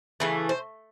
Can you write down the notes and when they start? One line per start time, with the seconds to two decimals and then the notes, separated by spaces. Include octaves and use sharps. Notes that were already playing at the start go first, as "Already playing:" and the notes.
0.20 C#3 E3 A3 B4
0.49 C5